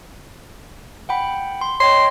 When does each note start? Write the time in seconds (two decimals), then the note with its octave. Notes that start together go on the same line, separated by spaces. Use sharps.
1.09 F#5 G5 B5
1.61 C6
1.80 C#5 D#5 G5 C6